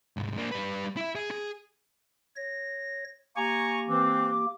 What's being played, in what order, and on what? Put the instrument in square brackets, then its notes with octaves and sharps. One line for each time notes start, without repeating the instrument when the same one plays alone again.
[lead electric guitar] C2 G#2
A#3 D4
G3 B4
E4 E5
G#4
G#4
[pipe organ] C#5 A#6
[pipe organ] A#3 G4 [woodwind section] G#5 A#5 C#6
[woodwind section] E3 C4 [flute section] D6